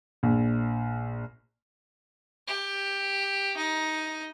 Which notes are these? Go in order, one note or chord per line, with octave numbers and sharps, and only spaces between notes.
A#1
G4
D#4